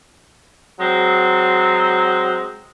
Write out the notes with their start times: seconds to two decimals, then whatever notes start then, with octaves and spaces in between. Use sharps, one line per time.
0.80 F#3 G#3 C4